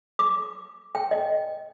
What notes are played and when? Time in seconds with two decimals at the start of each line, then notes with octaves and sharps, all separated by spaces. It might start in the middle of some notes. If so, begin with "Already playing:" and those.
0.19 D6
0.95 G5
1.11 D#5